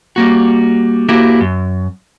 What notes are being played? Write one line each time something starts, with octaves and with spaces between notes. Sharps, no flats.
G3 A#3 F#4
A#3 E4 F#4 G4 A#4
F#2